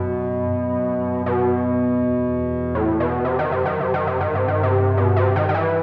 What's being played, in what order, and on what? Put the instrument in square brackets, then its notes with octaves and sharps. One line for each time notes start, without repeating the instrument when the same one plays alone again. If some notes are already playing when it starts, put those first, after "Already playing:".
Already playing: [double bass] F#2 [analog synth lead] B2
[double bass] F#2
[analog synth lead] B2
[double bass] E2
[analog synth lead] A2
B2
C3
D#3
[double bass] F#2 [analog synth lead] C3
[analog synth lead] D#3
C3
D#3
C3
[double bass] G2 [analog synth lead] D#3
[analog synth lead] C3
D#3
C3
B2
C3
D#3
D#3
E3